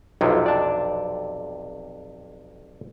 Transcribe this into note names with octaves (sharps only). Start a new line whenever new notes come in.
B1 F2 C3 D#4 F4 F#4
D5 A5